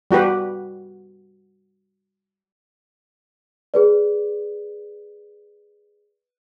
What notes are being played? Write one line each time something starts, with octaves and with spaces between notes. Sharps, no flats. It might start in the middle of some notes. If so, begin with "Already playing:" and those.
G3 F#4 G4 B4
G#4 B4 D5